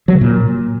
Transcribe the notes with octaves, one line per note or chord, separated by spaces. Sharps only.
F#3
C#3
A#2